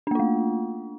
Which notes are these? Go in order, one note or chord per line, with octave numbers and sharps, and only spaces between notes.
A3 A#3 D4 F4